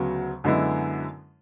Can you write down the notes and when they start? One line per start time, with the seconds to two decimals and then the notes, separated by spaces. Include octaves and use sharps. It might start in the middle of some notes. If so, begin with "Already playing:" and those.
Already playing: D2 C#3 F#3 B3
0.44 F#2 D3 G#3 B3 E4